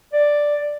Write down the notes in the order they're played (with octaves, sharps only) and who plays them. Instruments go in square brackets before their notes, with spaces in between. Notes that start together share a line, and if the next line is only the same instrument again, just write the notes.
[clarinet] D5